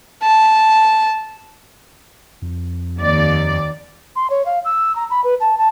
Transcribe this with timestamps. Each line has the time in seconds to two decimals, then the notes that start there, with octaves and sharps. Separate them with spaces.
0.23 A5
2.42 F2
2.97 D#2 D5
4.16 C6
4.30 C#5
4.46 F5
4.65 E6
4.96 A#5
5.10 B5
5.24 B4
5.40 A5
5.58 A5